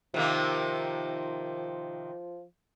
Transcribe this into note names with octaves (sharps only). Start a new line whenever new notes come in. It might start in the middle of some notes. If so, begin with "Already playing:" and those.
C3 D#3 F3 A#3